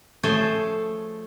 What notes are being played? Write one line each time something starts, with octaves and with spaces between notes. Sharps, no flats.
F3 A3 G#4 A4 C5 C#5